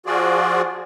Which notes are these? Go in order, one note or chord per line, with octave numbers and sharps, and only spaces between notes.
F3 F4 F#4 G#4 D5